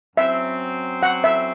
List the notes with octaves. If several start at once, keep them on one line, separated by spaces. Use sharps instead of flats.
F#2 F#3 C4 E5
F#5
E5